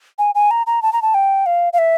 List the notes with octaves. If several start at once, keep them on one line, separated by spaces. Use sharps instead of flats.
G#5
G#5
A#5
A#5
A5
A#5
A5
G5
F5
F5
E5